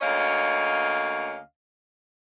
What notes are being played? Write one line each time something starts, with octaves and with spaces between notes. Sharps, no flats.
D2 A#3 C#4 C#5 D#5 F5